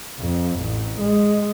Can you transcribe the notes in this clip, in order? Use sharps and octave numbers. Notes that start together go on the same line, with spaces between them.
F2
A1
G#3